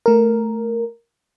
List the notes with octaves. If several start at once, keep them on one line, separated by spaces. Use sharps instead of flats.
A3 A#4